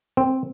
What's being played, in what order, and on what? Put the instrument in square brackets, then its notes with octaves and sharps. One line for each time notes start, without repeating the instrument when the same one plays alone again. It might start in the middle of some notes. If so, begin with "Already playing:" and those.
[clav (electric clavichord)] C4